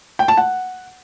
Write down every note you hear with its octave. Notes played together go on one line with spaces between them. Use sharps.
G5
A5
F#5